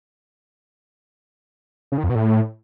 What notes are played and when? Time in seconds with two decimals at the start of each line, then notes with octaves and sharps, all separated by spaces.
1.92 C#3
1.98 D#3
2.04 F2
2.09 B2
2.15 A2